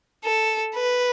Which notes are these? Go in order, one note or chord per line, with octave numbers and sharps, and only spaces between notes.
A4
B4